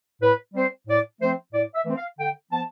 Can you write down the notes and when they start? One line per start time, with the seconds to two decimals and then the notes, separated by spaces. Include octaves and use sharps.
0.22 A2 B4
0.54 G3 C4 C5
0.87 A2 D5
1.20 F3 A3 C4 C5
1.53 A2 D5
1.74 E5
1.85 E3 A3 C4
1.96 F5
2.18 D3 G5
2.51 F3 B3 A5